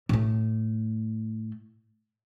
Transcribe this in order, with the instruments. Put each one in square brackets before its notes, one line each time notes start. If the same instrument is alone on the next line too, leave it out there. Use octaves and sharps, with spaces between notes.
[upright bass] A2 A3